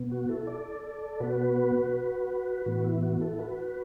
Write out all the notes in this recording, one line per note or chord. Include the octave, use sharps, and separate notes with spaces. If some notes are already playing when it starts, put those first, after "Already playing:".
Already playing: B2 B3
F#4
E4 A4
A4 D5
A4 D5
B2 B3 F#4 B4
A2 E3 B3 F#4
E4
F#4
E4 A4
A4
F#4 B4